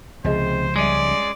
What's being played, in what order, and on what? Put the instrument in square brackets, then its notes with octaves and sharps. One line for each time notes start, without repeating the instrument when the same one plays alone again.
[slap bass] C#2 F3 [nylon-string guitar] C3 G#4 D#5 [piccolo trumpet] C5
[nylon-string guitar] G3 E5 [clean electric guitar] G#3 C#4 [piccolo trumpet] D5